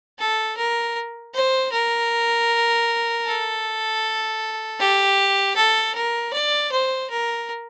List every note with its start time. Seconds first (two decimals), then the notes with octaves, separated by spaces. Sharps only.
0.19 A4
0.57 A#4
1.34 C5
1.72 A#4
3.26 A4
4.80 G4
5.56 A4
5.95 A#4
6.33 D5
6.72 C5
7.10 A#4